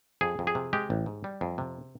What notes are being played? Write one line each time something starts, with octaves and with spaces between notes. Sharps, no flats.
F2 G#4
F2
G#4
C3
G#3 G4
A1
G#2
G3
F2
C3